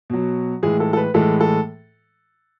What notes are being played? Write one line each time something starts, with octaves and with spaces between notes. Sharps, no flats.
B2 F#3
A2 E3 G#3 G#4
A4
A4
B4
A2 E3 G#3 A4
A4